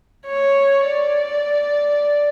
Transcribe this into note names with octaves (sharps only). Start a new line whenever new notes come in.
C#5
D5